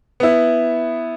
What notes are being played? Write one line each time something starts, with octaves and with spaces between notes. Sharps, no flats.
B3 E4